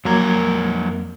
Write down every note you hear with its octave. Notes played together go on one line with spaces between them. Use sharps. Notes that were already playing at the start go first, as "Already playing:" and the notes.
F2 F#3 A#3 A#4 G#6